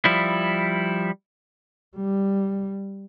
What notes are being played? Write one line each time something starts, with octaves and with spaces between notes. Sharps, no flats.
F3 G3 E4
G3